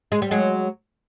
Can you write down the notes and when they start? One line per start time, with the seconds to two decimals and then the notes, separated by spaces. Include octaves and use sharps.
0.12 G#3
0.22 G3
0.31 F#3 G#3